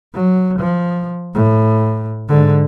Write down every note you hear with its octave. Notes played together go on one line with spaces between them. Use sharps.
F#3
F3
A2
G#2 D3